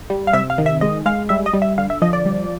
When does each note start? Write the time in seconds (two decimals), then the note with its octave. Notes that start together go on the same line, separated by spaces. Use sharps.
0.10 G3
0.27 F5
0.33 C3 E5
0.50 F5
0.58 D#3
0.66 E5
0.81 G#3 D#5
1.06 G#3 F5
1.29 G3 E5
1.46 D#5
1.53 G3
1.62 E5
1.78 D3 F5
1.90 E5
2.02 F3 D#5
2.13 D5
2.26 G3